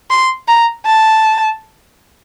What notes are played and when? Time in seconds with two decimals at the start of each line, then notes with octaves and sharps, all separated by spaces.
0.11 C6
0.48 A#5
0.86 A5